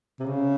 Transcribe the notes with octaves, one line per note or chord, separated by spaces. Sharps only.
C3
C#3